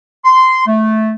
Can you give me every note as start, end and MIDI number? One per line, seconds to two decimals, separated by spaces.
0.24 0.63 84
0.66 1.12 57